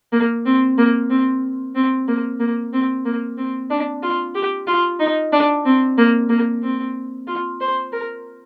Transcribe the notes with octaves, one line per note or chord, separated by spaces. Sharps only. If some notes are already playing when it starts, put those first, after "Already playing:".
A#3
C4
A#3
C4
C4
A#3
A#3
C4
A#3
C4
D4
F4
G4
F4
D#4
D4
C4
A#3
A#3
C4
F4
C5
A#4